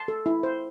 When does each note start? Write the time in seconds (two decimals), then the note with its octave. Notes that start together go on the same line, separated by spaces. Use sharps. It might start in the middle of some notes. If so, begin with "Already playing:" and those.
Already playing: A5 C6
0.08 A4
0.26 E4
0.43 C5